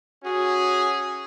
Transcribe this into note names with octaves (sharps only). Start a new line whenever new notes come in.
C#4 F#4 G#4